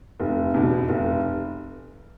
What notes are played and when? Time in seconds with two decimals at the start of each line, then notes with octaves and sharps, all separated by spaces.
0.20 F1
0.54 E2 B2
0.89 F1